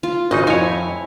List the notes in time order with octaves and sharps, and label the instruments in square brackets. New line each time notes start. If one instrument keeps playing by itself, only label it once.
[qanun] F4
[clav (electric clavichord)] G#1 C#3 D#4 [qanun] D#5
[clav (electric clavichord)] F2 C#5 [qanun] E4 G#5